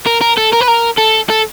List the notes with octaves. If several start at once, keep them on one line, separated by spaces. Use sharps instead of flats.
A#4
A#4
A4
A#4
B4
A#4
A4
A4